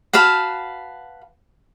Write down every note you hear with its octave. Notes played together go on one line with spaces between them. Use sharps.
F#4 B4 F5 A5